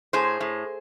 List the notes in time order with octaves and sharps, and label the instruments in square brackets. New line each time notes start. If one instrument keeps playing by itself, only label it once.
[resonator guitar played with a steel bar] A2 G#4 C5
A2